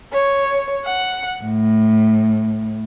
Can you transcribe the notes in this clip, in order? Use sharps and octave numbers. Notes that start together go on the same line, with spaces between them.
C#5
F#5
A2